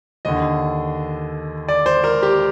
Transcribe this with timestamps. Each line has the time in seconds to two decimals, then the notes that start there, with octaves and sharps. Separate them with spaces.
0.25 D#2 D3 D#5
1.68 D5
1.86 C5
2.04 A#4
2.23 G4